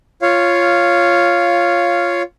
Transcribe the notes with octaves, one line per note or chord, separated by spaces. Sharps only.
F4 C#5 F5